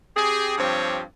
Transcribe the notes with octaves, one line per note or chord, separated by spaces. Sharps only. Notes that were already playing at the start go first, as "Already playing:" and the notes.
C4 G4 G#4
G2 F3 C4 G4 C#5